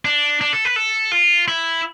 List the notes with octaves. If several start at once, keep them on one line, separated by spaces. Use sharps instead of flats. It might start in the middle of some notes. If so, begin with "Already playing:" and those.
D4
D4
A4
B4
A4
F4
E4